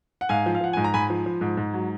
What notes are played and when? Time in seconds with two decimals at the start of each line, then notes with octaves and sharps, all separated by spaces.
0.21 F#5
0.29 G#2 F5 G#5
0.46 F3
0.55 F5
0.61 F3 F#5
0.73 G#2 G#5
0.84 A#5
0.94 G#2 G#5 B5
1.10 F3
1.26 F3
1.41 G#2
1.57 G#2
1.74 F#3